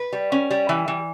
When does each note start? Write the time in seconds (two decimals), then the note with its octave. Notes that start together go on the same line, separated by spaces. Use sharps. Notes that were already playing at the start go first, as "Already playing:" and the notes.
Already playing: B4
0.12 G3
0.32 C#4
0.51 G3
0.69 E3
0.88 E3